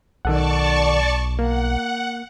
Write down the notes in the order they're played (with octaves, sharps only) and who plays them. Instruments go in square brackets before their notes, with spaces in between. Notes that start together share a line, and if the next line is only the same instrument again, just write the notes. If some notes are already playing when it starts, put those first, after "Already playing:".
[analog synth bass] B1 [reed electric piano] D#3 A4 F#5 [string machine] D5 A5 C#6
[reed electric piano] A#3 [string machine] F#5